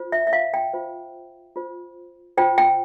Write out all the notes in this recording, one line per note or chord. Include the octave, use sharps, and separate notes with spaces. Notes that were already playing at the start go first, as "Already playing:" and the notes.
Already playing: F4 C5
E5
E5
F5
G5
F4 C5
F4 C5
F4 C5 G5
G5